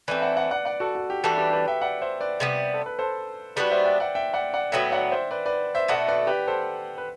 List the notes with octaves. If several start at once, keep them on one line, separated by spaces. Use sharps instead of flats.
E3 A3 C4 B4 D5
D5 F#5
D5 F#5
D5 F#5
D5 F#5
F#4 A4
F#4
G4
E3 G3 D4 F#4 A4
G4 B4
G4 B4
E5 G5
D5 F#5
C5 E5
B4 D5
C3 G3 B3
A4
B4
A4 C5
G3 B3 D4 F#4 B4 D5
C5 E5
E5 G5
D5 F#5
E5 G5
D5 F#5
D5 F#5
A2 F#3 B3 E5 G5
D5 F#5
C5 E5
B4 D5
B4 D5
C5 E5
B2 A3 E4 D5 F#5
B4 D5
G4 B4
A4 C5
B4